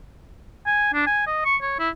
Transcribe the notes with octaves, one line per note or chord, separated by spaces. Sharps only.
G#5
D4
G#5
D#5
C#6
C#5
E4